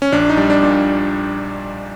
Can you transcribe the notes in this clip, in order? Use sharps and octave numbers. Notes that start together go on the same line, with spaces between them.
C#4
A#1 D4
D#4
G3 D4
D4
A#2